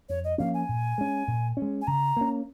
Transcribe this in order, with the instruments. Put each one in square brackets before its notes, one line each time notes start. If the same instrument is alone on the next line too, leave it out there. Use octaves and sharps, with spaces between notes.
[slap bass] F2 [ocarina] C#5
[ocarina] D#5
[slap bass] F3 A#3 C#4 [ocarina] F5
[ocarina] G#5
[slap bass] A#2
G#3 C#4
A#2
C#4
G#3
[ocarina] G#5
[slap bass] C#3 [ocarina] A#5
[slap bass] A#3 C#4